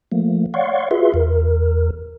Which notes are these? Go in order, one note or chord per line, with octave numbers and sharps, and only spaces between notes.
F3 A3 A#3
C#5 D5 F5 F#5 C6 C#6
F4 F#4 G#4 B4 E5 C6
E2 A#4